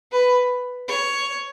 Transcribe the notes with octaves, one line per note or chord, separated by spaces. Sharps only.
B4
C#5